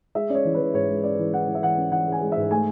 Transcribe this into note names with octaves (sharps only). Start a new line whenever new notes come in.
G#3 E5
C#4 D5
C#5
E3
B4
E3
G#2 C#5
G#3
C#4 D5
E3
E3 F#5
E3
E5
E3 F#5
C#4
E3 F#5
G#3
G#5
G#3
G#2 E5
A3 G#5